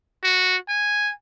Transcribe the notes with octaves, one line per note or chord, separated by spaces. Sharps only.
F#4
G#5